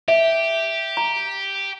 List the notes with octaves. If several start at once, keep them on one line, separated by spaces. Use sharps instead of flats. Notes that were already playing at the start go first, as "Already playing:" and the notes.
G4 E5
A#5